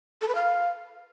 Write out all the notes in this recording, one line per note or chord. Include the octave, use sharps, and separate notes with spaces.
A4
B4
F5